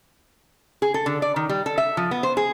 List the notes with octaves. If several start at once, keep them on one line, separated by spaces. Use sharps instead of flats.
G#4
A4
D3
D5
D#3
G3
A4
E5
F3
B3
C5
G#4